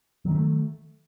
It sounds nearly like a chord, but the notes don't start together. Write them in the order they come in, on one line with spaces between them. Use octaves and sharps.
F#3 D#3 C#4 A3